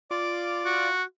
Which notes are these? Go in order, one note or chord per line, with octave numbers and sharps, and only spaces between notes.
F4 D5 D6
F#4